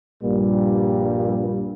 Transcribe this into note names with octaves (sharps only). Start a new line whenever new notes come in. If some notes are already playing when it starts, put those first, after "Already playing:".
A#1 G2 A#2 G3 A#3